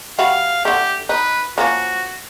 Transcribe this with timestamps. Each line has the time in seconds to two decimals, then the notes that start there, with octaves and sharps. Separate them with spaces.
0.19 G3 F#4 E5 F5
0.65 D3 A3 G4
1.09 D#4 B4
1.58 F3 A#3 C#4 F#4